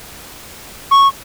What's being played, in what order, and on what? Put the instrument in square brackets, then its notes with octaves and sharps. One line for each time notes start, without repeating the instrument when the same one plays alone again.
[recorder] C#6